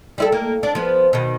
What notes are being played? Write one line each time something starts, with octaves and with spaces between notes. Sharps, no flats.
G3 E4 A4
A#3
D4
F3 B3
B2 D#3